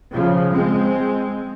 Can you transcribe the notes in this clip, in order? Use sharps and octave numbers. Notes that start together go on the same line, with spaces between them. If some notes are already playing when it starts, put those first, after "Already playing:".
C#3 F3
G#3 C4